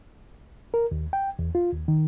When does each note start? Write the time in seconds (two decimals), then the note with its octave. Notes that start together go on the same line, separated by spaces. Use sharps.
0.74 A#4
0.91 D#2
1.13 G5
1.39 E2
1.55 F4
1.72 D#2
1.88 D#3